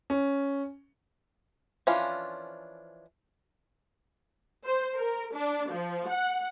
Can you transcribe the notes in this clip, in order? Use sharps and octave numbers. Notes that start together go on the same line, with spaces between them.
C#4
E3 F3 C#4 D4 F4
C5
A#4
D4
F3
F#5